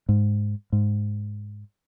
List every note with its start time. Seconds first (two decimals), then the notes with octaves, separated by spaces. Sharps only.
0.09 G#2
0.72 G#2